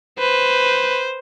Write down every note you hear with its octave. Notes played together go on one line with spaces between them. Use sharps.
B4 C5